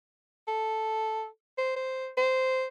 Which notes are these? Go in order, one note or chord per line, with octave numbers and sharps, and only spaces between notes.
A4
C5
C5
C5